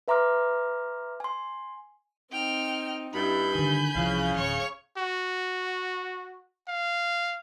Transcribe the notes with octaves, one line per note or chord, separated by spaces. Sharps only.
B4 E5 A#5 C6 D6 F6
G#5 C6
C4 D#4 G5 F6
G2 D#4 E4 B5 G6
D3 D#3 G#5
C2 C#3 E3 F3 F5
D1 C#5 C#6
F#4
F5